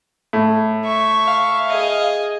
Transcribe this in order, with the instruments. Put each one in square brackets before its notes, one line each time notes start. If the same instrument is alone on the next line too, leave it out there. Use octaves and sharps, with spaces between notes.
[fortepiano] A2
[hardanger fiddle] E5 C#6
[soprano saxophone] F5
[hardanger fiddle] G#4 D#5